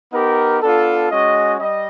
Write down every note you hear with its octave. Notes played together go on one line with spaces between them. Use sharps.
B3 D#4 G4 A#4
B3 D4 F4 A4
G#3 C#4 F#4 D#5
G3 D#5